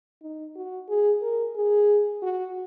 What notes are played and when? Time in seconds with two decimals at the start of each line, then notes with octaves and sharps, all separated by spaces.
0.22 D#4
0.55 F#4
0.88 G#4
1.22 A#4
1.55 G#4
2.22 F#4